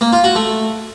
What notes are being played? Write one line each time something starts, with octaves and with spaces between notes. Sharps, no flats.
A#3
F4
F#4
A3